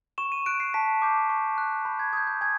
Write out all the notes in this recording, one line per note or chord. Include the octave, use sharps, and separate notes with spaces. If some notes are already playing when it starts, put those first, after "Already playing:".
C#6 E7
D#7
F#6 D7
C7
A5 B6
D6 G6
C#6
F#6
B5 G6
G#6
D#6 G6 G#6
G6
G#5 G#6